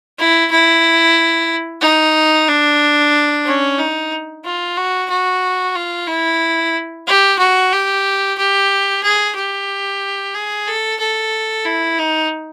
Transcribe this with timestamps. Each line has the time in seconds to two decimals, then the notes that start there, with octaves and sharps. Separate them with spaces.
0.18 E4
0.51 E4
1.81 D#4
2.48 D4
3.45 C#4
3.78 D#4
4.44 F4
4.77 F#4
5.10 F#4
5.75 F4
6.07 E4
7.07 G4
7.39 F#4
7.72 G4
8.38 G4
9.03 G#4
9.36 G4
10.34 G#4
10.68 A4
10.99 A4
11.65 E4
11.99 D#4